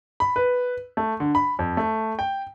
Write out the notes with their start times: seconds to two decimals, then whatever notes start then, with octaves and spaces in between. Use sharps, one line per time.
0.20 B5
0.36 B4
0.97 A3
1.20 D3
1.35 B5
1.59 F2
1.77 A3
2.19 G5